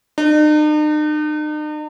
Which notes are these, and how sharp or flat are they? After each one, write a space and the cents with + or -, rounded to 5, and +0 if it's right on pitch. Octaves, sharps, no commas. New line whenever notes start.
D#4 -45